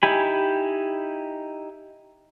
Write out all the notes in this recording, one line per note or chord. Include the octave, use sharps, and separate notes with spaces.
D#4 E4 G4 G#5 B5